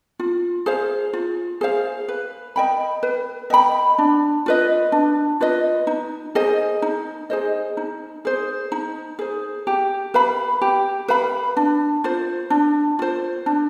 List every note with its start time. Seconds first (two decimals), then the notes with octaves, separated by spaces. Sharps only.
0.19 F4
0.66 G#4 C5 F5
1.13 F4
1.61 G#4 C5 F5
2.08 B4
2.56 D#5 G5 B5
3.03 B4
3.50 D#5 G5 B5
3.98 D4
4.46 F4 B4 D#5
4.92 D4
5.41 F4 B4 D#5
5.87 D#4
6.35 G#4 C5 D#5
6.82 D#4
7.30 G#4 C5 D#5
7.77 D#4
8.25 G#4 C5
8.72 D#4
9.19 G#4 C5
9.67 G4
10.14 B4 F5 B5
10.61 G4
11.08 B4 F5 B5
11.57 D4
12.04 F4 C5
12.50 D4
12.99 F4 C5
13.46 D4